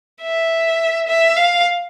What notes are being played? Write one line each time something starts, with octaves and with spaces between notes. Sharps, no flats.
E5
E5
F5